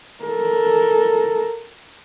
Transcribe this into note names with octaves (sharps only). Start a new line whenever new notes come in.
A4 A#4